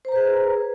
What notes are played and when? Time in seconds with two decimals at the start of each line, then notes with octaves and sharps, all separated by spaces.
0.05 C5
0.08 A#5
0.12 B4
0.16 G#4